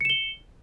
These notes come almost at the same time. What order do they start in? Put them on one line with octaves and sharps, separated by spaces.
C#7 E7 G7